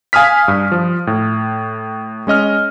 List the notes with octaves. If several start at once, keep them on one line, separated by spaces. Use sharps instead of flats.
F5 G#5 D#6 F6 B6
G2
F3
A2
G#3 C#4 D#5 F6